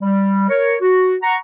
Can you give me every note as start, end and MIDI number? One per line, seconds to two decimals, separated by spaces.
0.01 0.46 55
0.49 0.75 70
0.49 0.75 73
0.81 1.16 66
1.22 1.36 78
1.22 1.36 82
1.22 1.36 85